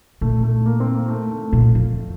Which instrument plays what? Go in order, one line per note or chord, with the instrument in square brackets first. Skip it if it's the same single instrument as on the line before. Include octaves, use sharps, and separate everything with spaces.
[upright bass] A#2 [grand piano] A3
[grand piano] A3
A#3
C4
A#3
A3
A3
[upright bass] A#2
F2